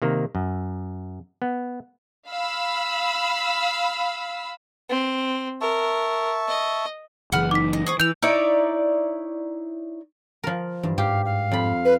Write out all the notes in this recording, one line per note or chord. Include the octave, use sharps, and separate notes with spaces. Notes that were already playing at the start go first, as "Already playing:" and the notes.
C3 D#3 A#3
F#2
B3
F5 B5 E6
C4
A#4 E5 A5 C#6
D#5
F#1 B2 E3 G#4 F#5 B5 F6
D#4 D6 B6
D#5
G#4 C5 C#6 D#6
E3 E4 E6 G6 F7
D#4 E4 C#5 D5
F3 A#4
G2 E3
G#2 G4 F5
F5
F2 B5
B4